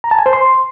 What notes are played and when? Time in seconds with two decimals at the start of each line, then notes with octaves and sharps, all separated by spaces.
0.04 A#5
0.11 A5
0.19 G#5
0.26 C5
0.33 C6